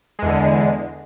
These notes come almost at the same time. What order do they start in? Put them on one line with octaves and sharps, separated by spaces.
G#3 E2 D3